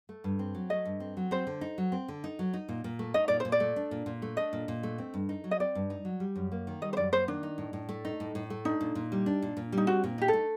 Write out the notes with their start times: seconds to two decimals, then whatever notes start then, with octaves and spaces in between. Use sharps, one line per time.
0.09 A3
0.24 G2
0.39 C4
0.55 F#3
0.70 A3 D#5
0.85 G2
1.00 C4
1.17 F#3
1.31 C4 C5
1.47 D3
1.61 D#4
1.78 F#3
1.92 C4
2.08 D3
2.24 D#4
2.39 F#3
2.54 D#4
2.69 A#2
2.84 A#2
2.99 A3
3.14 D#4 D#5
3.28 A#2 D5
3.40 A#2 C5
3.52 D5
3.60 A3
3.76 D4
3.91 A#2
4.06 A#2
4.22 A3
4.37 D4 D#5
4.53 A#2
4.68 A#2
4.83 A3
4.98 C4
5.14 G2
5.29 D#4
5.44 F#3
5.51 D#5
5.60 C4 D5
5.75 G2
5.90 D#4
6.05 F#3
6.20 G3
6.36 F#2
6.52 A#3
6.67 D#3
6.82 G3 D#5
6.93 C5
6.97 F#2 D5
7.13 A#3 C5
7.28 D#3 D4
7.43 D#4
7.58 A2
7.73 A2
7.89 A3
8.05 D#4
8.20 A2
8.35 A2
8.50 A3
8.65 D4 D#4
8.81 A#2
8.95 A#2
9.12 G3
9.26 D4
9.42 A#2
9.57 A#2
9.72 G3
9.78 D#4
9.87 C4 F#4
10.04 A#2
10.18 D#4 G4
10.28 A4
10.33 A3